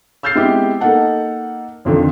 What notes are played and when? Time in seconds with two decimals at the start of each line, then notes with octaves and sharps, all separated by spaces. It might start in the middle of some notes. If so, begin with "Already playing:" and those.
0.23 E6 F6 G6 A6 C7
0.35 G#3 B3 C4 E4 G4
0.81 A#3 D#4 A4 D#5 F#5 A5
1.85 G#1 F2 D3 F3